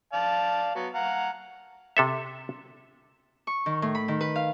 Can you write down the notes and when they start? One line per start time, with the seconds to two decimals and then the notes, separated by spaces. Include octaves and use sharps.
0.13 D5 F5 A5
0.75 F#3 B3
0.94 F5 F#5 A#5
1.97 C3 A4 E5
3.47 C#6
3.66 D#3
3.82 A2
3.95 B5
4.08 D#3
4.21 B4
4.36 F5